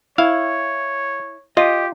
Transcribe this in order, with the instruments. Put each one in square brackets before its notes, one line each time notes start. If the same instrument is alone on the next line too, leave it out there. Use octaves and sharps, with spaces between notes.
[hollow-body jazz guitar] E4 [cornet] C#5 [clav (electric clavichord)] F5
[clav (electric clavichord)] F4 [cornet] G4 [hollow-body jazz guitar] D#5